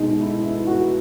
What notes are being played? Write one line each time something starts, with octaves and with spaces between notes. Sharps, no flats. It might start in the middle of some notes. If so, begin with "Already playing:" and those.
Already playing: B2 G#3 D#4
E4
E4
F#4